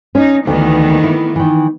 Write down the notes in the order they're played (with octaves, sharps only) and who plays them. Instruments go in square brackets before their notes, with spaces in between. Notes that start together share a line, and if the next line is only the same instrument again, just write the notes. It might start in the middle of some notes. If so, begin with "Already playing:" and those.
[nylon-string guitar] C#4 [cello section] D#4
[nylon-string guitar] D2 [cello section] D#3 E3 B3
[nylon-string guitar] E4
D#3 E3